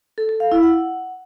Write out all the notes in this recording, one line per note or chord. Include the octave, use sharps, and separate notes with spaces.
A4
A4
F5
E4
F#5